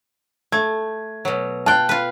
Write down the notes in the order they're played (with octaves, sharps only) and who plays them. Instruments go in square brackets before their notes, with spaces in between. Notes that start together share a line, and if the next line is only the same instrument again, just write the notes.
[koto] A3 [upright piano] G#6
[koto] B2 F#3
[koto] F4 G5 [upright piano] A5 F#6
[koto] F4 B4